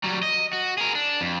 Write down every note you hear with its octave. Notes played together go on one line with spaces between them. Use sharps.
F#3 G3
D#5
F#4
G#4 A#4
D4
F2